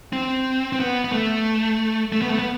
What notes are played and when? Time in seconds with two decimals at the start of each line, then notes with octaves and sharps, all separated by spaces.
0.13 C4
0.73 C4
0.80 B3
1.05 B3
1.12 A3
2.13 A3
2.22 B3
2.30 A3
2.39 B3